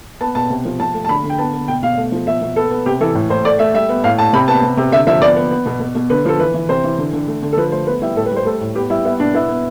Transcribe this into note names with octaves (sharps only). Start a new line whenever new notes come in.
B3 A5
B2 A5
C3
F3
F3 A5
A3
A5
D3 B5
D3
G5
B3 A5
B3
B2 G5
B2 F5
A3
F3
B2 E5
B2
B3 A4
B3
C3 G4
E3 A4
A2
A2 C5
A3 D5
A3 E5
G3 E5
B3
A2 F5
A2 A5
C3 B5
B3 A5
C3
C3
D3 E5
F3 E5
B3 D5
B3
B3
B2
B2
B2
D3 B4
F3 A4
E3 B4
E3
C3 C5
E3
D3
D3
A3
D3
A4
F3 B4
A3 C5
B3 B4
G3 E4
A2 A4
B4
G3 C5
A3 A4
A2
B3 G4
G3 E4
B3 E4
B2 D4
B3 E4
B3